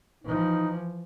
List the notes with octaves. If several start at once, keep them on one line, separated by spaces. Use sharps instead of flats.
E3 F3 D#4